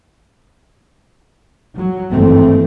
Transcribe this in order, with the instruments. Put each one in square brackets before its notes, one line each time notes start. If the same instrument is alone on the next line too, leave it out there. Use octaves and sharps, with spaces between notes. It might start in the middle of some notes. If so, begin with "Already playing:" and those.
[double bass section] F#3
G1 D#2 G#2 E3 A3 C4